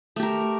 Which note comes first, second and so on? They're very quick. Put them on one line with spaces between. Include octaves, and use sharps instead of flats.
A3 G4 A#4